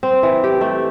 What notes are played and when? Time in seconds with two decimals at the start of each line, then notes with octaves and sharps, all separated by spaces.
0.03 C4
0.23 E3
0.44 G4
0.61 A3